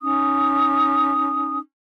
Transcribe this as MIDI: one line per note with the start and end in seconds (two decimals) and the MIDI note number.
0.02 1.59 61
0.02 1.59 63
0.02 1.59 87